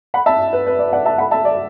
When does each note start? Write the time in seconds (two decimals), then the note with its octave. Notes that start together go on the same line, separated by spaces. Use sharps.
0.14 F#5 B5
0.26 E5 A5
0.53 B4
0.67 B4
0.79 D5
0.93 D5 F#5
1.06 E5 A5
1.18 F#5 B5
1.31 E5 A5
1.45 D5